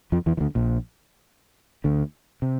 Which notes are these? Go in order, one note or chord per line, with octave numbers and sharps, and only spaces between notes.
F2 F3
E2 E3
E3
D2 D3
A#1 A#2
D2 D3
C3